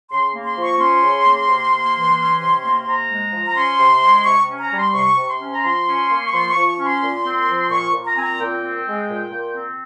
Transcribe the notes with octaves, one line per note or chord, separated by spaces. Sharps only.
C#3 C6
A#3
C6
F3
C#6
C#4 C6
C#3
A#3
C3
A#3
E3
C#4
C3
A#3
C3 A#5
G#3
F3
A#5
C#4 C6
C3
G#3
C3 C#6
C#4
A#5
G3
C6
C3 C#6
C3
C6
C#4
A#5
F3 C6
C#4
A#3
C#6
F3 C6
C#6
F3
C#6
C#4
C6
A#2
C4
F3
A#2 C#6
A#2
A#5
C4 G#5
A#5
A#2 G5
C4
G#3
A#2
A#2
C4